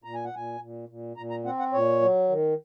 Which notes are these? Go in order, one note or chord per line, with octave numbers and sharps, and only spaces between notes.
A#2 A#5
G#5
F#5
A#2 G#5
A#2
A#2
A#2 A#5
A#5
C4 F#5
F#5
A#2 C#5
F#3
D#3